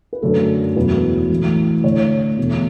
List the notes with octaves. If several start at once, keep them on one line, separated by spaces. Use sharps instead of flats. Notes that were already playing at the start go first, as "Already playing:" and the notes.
B4
F#2 D3 A3 A4
E1 E2 B2 F#3 B4
A1 A2 E3
D2 D3 A3 C#5
E2 B2 A3